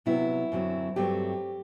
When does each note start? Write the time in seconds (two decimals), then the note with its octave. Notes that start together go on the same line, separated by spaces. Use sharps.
0.06 C3 F#3 B3 E4
0.52 F#2 D3 F#3 C4
0.96 G2 F#3 A3 C4 G4